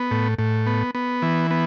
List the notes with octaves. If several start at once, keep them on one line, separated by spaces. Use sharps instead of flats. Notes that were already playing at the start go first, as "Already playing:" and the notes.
Already playing: B3
A2
A2
B3
B3
E3
B3